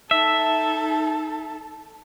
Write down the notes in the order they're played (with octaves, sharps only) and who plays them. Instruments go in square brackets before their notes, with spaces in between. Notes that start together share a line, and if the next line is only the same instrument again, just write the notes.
[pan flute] D#4 [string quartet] A4 [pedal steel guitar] E5